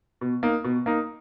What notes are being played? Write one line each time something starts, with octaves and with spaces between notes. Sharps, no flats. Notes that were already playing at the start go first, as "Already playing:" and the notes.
B2
A#3 D#4
B2
A#3 D#4